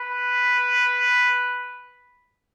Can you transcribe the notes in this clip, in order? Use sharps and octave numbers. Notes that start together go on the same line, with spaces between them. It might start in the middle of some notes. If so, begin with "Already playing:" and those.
Already playing: B4